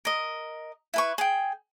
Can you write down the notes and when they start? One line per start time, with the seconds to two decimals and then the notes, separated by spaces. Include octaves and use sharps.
0.05 A#4 D#5
0.94 E4 B4 C#6
1.18 G#4 G5